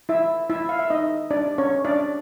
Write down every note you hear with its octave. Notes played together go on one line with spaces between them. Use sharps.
E4 E5
E4 E5
F5
E5
D#4 D#5
D4 D5
C#4 C#5
D4 D5